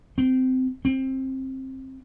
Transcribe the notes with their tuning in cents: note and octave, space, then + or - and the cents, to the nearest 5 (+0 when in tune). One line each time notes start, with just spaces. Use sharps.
C4 -20
C4 +20